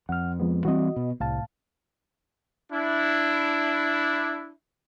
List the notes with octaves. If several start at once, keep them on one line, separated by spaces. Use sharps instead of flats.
F2 F#5 F6
F3 G#3 B3
E3 G3 C4 F#4 D#5
B2
C2 A2 F5 A5
D4 E4